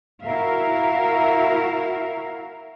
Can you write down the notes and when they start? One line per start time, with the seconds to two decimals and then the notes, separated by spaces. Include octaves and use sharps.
0.23 E4 F#4 A#4 E5 F5